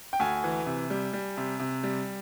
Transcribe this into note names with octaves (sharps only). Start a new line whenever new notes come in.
G5
D2 G#5
E3
C3
G3
G3
C3
C3
G3